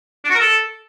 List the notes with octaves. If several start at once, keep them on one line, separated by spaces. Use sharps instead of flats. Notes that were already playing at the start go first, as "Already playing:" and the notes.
D4
F#4
A#4
A4